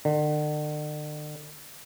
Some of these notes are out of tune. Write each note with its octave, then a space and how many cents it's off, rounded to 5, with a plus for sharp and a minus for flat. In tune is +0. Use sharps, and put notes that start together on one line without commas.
D3 +40